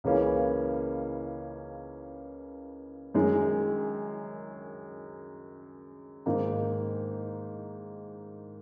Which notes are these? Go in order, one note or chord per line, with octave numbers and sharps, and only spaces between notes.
C#2 C#3 E3 A#3 C#4
F#2 D#3 G#3
G#2 D#3 A#3 D#4